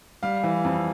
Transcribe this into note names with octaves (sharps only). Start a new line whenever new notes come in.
G3 F5
E3
F2